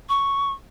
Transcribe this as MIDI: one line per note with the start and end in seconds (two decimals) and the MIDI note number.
0.09 0.51 85